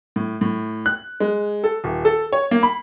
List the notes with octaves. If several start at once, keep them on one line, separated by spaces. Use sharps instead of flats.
A2
A2
F#6
G#3
A4
D#1
A4
C#5
A#3
B5